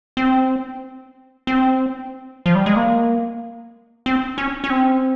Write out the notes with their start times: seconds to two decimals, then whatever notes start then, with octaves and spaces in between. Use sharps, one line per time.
0.17 C4
1.47 C4
2.46 F3
2.55 G3
2.66 G#3
2.76 A#3
4.06 C4
4.38 C#4
4.64 C#4
4.70 C4